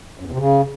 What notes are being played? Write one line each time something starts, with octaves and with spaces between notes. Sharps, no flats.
F#2
E2
C3
C#3